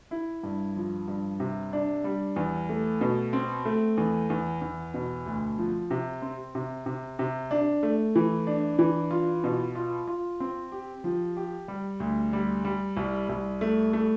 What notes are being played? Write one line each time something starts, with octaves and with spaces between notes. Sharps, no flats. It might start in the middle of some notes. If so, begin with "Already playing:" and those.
E4
G2
F3
G2
C3
D4
G3
E2
A3
B2
C4
A3
E2
E2
E2
B2
D2
F3
C3
C4
C3
C3
C3
D4
A3
E3
D4
E3
F4
B2
F4
F4
C4
G4
F3
G4
G3
D2
G3
G3
C2
C2
A3
A3